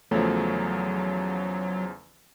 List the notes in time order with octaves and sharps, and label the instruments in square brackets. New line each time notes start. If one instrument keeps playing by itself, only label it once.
[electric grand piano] E2 C#3 F3 [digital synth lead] F#3 [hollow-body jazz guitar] A3